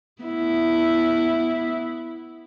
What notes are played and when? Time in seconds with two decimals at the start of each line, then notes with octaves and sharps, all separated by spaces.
0.23 B3 E4